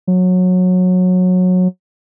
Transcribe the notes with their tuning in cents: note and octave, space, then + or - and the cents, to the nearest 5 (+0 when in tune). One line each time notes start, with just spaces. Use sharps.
F#3 -20